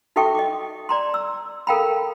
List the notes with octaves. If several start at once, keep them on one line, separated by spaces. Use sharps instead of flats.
D#4 F#4 A4 E5 G5 C#6
D#5 D6
D5 A#5 C6
E6
A4 A#4 F5 G5 A#5 B5